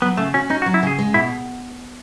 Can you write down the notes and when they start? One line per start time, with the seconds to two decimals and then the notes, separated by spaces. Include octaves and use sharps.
0.02 F#3 B3
0.17 C#3 A3
0.34 C#4 F#4
0.50 C#4 D#4
0.62 F#4
0.66 F#3
0.74 E4
0.83 C#3 G#4
0.99 G#3
1.14 B2 E4